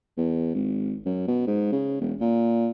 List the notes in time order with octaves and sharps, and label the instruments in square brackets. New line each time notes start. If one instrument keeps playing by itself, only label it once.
[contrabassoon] E2
G#1
F#2
B2
G#2
C#3
E1
A#2